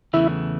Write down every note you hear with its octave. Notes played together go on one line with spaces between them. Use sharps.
E2 C#3 E3 A3 E4